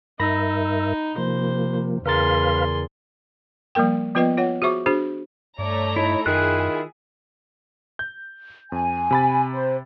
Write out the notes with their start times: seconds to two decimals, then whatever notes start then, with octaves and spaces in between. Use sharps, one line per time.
0.20 G2 D#4 A#4 E5 B5 A#6
1.17 C3 F3 A#3 C5
2.06 E2 C#3 G#4 A#4 B4 F5 C6 A6
3.75 F3 G3 A#3 A#4 G5
4.15 F3 B3 F4 B4 D#5 G5
4.37 F4 C#5 F#5
4.62 F#4 G#4 C5 E5 C#6 D6
4.86 D4 F#4 G#4 C5
5.58 G2 A3 C#5 D5 A#5
5.96 D#4 E4
6.26 F#2 D#3 E4 F4 G#4 F#6
7.99 G6
8.72 F2 G#5
9.11 C3 B5 A6
9.54 C5